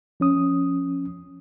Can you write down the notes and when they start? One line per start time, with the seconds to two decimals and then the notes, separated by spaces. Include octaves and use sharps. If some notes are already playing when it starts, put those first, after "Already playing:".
0.20 F3 C#4 D#6